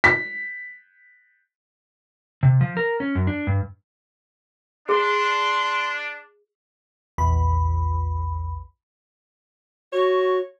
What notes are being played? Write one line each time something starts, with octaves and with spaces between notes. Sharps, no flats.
B6
C3
F3
A#4
C#4
F#2
D4
G2
D4 G#4 C6
A#1 E2 B5
F#4 C#5